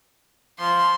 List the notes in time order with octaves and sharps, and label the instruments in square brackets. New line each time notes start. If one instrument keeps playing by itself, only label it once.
[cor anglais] F3 [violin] C6